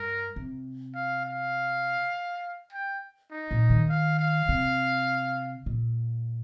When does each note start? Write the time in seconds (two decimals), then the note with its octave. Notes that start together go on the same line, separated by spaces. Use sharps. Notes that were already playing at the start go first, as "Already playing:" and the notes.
Already playing: G2 A#4
0.36 C3
0.95 F5
1.25 F5
2.72 G5
3.31 D#4
3.51 A#2
3.70 D#3
3.89 F5
4.19 F5
4.49 C3
5.66 A#2